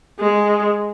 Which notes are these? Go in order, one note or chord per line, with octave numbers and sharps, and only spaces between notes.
G#3